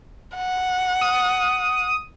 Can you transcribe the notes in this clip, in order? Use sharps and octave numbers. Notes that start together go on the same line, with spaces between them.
F#5
D#6